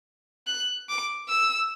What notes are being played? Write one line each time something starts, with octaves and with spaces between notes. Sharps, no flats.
F#6
D6
E6